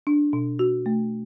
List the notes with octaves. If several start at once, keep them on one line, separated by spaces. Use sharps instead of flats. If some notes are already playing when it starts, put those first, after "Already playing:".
D4
B2
F#4
A3